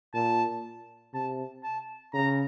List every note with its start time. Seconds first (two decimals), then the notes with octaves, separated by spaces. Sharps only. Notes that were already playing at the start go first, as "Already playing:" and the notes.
0.14 A#2 A5
1.14 C3 A5
1.64 A5
2.14 C#3 A#5